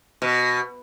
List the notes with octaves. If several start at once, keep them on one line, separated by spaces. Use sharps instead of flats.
B2